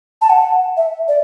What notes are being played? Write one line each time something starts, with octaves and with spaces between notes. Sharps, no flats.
A5
F#5
E5
D5